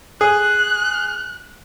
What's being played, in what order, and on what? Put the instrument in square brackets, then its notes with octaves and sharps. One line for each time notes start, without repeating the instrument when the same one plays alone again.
[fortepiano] G#4 [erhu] F#6